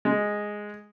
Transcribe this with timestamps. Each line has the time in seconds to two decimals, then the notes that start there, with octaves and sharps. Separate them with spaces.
0.05 G#3